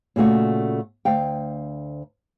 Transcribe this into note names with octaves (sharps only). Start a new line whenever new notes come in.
A#2 C#3 A3 F#4
D2 F5 G5